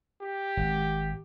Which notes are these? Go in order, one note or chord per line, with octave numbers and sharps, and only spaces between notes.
G4
G#1